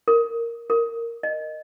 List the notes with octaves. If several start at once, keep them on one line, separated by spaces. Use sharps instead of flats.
A#4
A#4
D#5